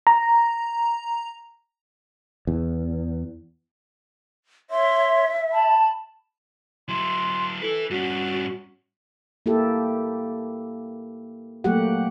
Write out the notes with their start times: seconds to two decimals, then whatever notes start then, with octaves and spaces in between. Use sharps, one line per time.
0.07 A#5
2.47 E2
4.70 C#5 E5 C6
5.52 A5 B5
6.89 F#3 E4 C6
7.62 E4 A4 B4
7.90 G2 C#4 F#4
9.46 A#3 E4 G4 A4
11.64 F#3 A3 A#3 F#4 G4 F#5